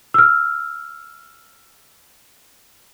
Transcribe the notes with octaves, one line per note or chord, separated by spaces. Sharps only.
E6 F6